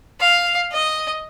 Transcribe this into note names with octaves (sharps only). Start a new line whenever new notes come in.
F5
D#5